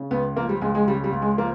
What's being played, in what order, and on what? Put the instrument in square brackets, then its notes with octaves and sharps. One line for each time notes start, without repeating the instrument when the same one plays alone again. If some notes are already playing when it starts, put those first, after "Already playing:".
Already playing: [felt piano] C#3
C#2 B3
F3 A#3
G3
C#2 G#3
G#3
C#3 G3
G3
C#2
G#3
F3 A#3